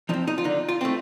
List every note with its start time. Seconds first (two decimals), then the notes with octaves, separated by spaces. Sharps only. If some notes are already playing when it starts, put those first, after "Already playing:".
0.09 F3 D#4
0.13 C4
0.27 D#4
0.38 F4
0.44 D3 D#4
0.69 F4
0.81 A3 C4